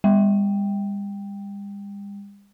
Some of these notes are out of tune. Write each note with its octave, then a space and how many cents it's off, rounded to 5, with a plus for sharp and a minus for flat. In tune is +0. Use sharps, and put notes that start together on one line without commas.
G3 +45 G5 +0